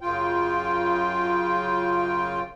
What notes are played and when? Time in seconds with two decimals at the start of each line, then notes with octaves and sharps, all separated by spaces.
0.01 F#2 C#3 F4 G5